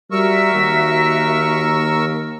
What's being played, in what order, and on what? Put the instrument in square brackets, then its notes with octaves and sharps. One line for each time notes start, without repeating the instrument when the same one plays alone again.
[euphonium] G3 [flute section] F#4 E5 [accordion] A#4 C#6 E6
[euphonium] D#2